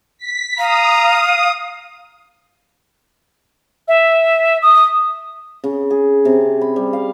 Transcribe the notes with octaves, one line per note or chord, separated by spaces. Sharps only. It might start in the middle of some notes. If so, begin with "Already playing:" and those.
B6
F5 A#5 D#6
E5
D#6
C#3
G#4
C3
B5
G3
F5